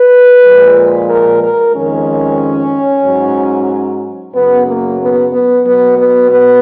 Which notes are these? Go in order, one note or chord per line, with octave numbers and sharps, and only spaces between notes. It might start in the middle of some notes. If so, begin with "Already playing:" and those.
Already playing: B4
A#2 F3 G#3
A#4
A#4
F2 D#3 G#3 C#4
G#2 F#3
F#2 C#3 F#3 B3
A#3
B3
B3
B2 F#3 B3
B3
B3